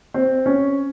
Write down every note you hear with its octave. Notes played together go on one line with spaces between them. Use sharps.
C4
C#4